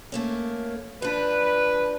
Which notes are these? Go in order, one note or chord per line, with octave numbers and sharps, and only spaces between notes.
A3 A#3 C#4
F3 D4 B4